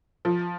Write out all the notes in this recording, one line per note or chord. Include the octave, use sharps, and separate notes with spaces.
F3